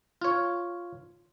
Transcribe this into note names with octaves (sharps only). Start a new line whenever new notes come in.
F4 C#5